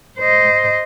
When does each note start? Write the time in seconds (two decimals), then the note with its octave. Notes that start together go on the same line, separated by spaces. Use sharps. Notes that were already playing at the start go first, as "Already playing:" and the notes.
0.18 C5 D#5